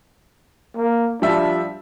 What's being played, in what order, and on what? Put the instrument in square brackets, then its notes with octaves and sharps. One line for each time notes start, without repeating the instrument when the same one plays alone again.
[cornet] A#3
[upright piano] F3 G3 E5 [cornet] D4